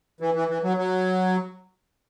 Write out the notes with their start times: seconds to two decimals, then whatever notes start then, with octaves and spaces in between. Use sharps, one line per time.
0.20 E3
0.34 E3
0.48 E3
0.63 F#3
0.78 F#3